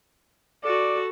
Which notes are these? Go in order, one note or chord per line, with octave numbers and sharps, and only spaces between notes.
F#4 A4 D5